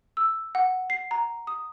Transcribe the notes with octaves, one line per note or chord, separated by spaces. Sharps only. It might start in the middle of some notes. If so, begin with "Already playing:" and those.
E6
F#5
C7
A#5
D#6